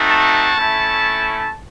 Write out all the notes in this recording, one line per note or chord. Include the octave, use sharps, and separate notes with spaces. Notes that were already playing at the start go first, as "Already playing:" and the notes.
Already playing: A3 C4 D#4 F#4
A5
A3 C#4 E4